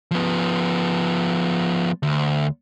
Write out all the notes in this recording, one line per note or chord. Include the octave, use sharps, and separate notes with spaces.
F3 B3
D2